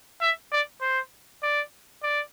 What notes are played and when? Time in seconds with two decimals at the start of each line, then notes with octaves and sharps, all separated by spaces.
0.21 E5
0.52 D5
0.81 C5
1.43 D5
2.03 D5